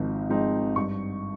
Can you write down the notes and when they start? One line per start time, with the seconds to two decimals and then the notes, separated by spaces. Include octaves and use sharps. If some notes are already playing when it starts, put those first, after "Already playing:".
Already playing: G#1 G#2 F3 C4 D#4
0.29 G#2 F3 C4 D#4
0.76 G2 C#6